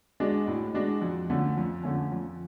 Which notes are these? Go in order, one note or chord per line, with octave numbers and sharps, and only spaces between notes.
G#3 D4 F#4
A2
G#3 D4 F#4
F2
D3 F3 A3 C#4
F2
D3 F3 A3 C#4
F2